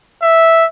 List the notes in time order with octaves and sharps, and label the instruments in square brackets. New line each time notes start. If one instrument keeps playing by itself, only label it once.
[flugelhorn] E5